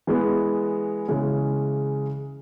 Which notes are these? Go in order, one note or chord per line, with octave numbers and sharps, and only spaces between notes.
E3 G#3 B3
C#3 E3 G#3